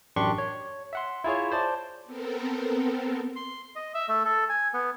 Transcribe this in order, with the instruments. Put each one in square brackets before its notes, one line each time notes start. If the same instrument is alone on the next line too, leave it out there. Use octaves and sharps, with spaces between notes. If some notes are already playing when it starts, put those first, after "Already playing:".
[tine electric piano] A1 F#2 D4 G4 C6 C#6
C#5
E5 F#5 C6
E4 F4 G#4 C#5
C5 D5 A5
[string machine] B3 C4 A4 A#4
[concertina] C6
D#5
E5
A3
A4
G#5
B3